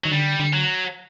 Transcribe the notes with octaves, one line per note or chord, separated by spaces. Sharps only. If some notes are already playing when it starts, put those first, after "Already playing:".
D#3 F#3
D3 G3
D3
F#3